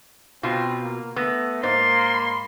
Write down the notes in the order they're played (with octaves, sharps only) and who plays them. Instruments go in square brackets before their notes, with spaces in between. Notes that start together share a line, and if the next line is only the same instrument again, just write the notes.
[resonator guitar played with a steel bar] B2 F4 [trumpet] C4
[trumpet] A#3
[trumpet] A3 [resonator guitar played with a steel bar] B3 [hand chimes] E6 A#6
[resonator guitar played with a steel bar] G#2 [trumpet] A#3 [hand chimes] C5 A6 [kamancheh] C6
[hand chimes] B5